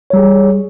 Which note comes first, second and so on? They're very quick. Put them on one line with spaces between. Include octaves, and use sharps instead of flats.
C#5 G3 G#4